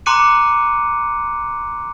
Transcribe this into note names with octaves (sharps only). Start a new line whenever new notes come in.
A#5 C6 D6 F#6 C#7 D#7